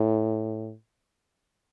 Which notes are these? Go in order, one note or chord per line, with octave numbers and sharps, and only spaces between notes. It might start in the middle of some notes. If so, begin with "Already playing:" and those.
Already playing: A2